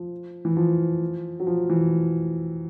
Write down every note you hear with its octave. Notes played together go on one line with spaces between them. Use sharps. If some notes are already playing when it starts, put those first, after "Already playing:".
Already playing: F3
E3
F3
F#3
F3
E3